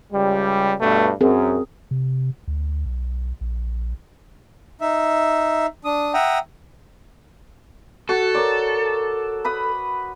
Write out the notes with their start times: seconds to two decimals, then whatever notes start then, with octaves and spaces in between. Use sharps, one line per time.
0.12 C#2 G3
0.80 G2 B2 A3
1.21 F#2 C4 G#4 A#4
1.91 C3
2.48 D2
2.86 B1
3.41 A#1
4.81 D#4 E5
5.85 D4 D#6
6.14 E5 F#5 G5 A#5 D#6
8.09 F#4 A4
8.34 A#4 C#5 D5
9.45 B4 B5 D#6